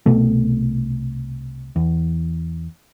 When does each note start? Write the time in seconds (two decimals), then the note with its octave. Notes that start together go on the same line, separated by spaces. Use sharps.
0.06 C2 B2 A3
1.76 E2